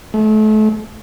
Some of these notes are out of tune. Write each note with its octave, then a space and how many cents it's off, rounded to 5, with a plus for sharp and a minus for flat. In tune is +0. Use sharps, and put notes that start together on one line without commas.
A3 -35